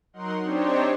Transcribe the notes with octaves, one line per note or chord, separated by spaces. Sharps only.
F#3 D#4 A#4 F#5 C6
C4 D4 D#4 G4 C5 C#5